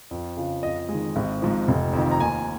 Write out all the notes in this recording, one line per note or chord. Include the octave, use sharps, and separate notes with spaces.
F2
C#3 F3
F2 D#5
G#3
D#3
G#1
G#2 F3
F1
F2 D#3
A#5
D#2 G#5